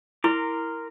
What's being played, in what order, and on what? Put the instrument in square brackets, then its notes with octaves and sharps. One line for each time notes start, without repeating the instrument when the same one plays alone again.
[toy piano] E4 [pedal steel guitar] A#4 C6 D6